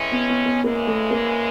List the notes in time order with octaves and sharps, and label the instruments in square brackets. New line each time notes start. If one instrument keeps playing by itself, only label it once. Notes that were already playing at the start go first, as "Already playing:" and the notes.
Already playing: [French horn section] A2 E3 G#3 C#4
[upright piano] B3
B3
B3
[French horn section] E2 C#3 E3 G#3 [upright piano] A#3
[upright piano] A3
A#3